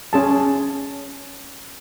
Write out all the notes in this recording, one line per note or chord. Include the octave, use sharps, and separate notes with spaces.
C#4 G#4 A5